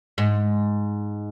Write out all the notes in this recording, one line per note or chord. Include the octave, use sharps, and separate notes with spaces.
G#2